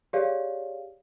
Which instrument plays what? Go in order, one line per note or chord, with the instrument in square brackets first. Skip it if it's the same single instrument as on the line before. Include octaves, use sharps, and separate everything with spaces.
[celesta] G4 G#4 C#5 D5 F5